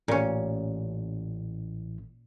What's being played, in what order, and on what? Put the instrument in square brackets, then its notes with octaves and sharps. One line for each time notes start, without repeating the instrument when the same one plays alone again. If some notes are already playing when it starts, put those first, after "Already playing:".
[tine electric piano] A1 [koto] A#2 C#4